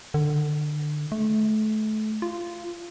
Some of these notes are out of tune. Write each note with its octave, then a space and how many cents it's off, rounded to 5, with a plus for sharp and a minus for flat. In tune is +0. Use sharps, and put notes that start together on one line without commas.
D3 +25
A3 -30
F4 -15